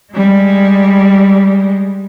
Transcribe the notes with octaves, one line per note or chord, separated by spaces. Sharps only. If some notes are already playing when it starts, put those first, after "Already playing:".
G3 G#3